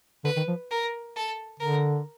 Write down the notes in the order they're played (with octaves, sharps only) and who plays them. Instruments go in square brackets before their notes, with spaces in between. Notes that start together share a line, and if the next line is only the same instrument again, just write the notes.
[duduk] D3 [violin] B4
[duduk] D#3
F3
[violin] A#4
A4
[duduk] D3 [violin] A#4